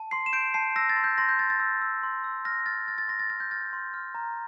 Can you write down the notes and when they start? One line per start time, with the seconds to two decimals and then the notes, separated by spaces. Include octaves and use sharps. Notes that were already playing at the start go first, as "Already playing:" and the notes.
Already playing: A5
0.11 C6 C7
0.26 E7
0.33 G6 D7
0.54 A5 C7
0.76 E6 A#6
0.89 A6
0.97 C6
1.04 G6
1.18 C6 A#6
1.29 G6
1.39 G6 A6
1.50 A6
1.60 E6
1.82 E6
2.03 C6
2.24 E6
2.45 F6 A#6
2.66 F6 A6
2.88 F6 A6
2.98 A6
3.08 C6 A#6
3.19 A6
3.30 F6 A6
3.40 G6
3.51 F6 A6
3.73 C6
3.94 F6
4.15 A#5